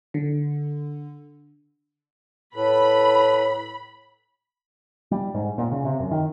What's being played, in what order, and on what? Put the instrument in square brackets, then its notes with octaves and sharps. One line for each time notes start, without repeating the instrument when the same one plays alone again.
[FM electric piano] D3
[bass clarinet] A2 [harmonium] A4 B4 [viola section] B5
[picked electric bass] G3
G#2
A#2
C#3
C3
F#2
D#3